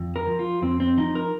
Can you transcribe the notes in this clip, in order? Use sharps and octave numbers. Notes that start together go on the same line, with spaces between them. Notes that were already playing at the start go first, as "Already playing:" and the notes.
Already playing: F2
A#4
F3
F4
F2 C4
C4
F3 D#4
A#4